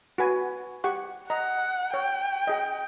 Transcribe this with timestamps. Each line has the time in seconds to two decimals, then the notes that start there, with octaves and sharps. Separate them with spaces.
0.18 F#4 B4 G#5
0.84 G4 F#5 C#6
1.30 D#5 F#5 A#5
1.94 C#5 G5
2.47 G#4 D#5